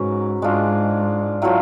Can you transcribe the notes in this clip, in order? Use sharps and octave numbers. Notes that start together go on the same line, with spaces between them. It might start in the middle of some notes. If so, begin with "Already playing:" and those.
Already playing: G#2 F#3 C#4 F#4 B4
G#2 G#3 D4 F4
A2 F#3 A3 F4